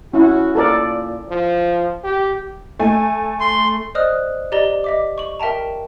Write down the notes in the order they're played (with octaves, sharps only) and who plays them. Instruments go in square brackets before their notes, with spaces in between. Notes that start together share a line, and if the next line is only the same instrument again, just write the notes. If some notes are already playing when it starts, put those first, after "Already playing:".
[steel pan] C#4 E4 [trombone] F#4
[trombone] A#2 [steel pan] A4 A#4 D5
[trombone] F3
G4
[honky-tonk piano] A3 G#5
[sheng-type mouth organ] C6
[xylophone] C5 D5 D#5 D#6 F6 F#6
G4 D5 D#5 A#5 G7
D#5 E5 D6
C#6 F#7
A#4 E5 G5 A5 A#5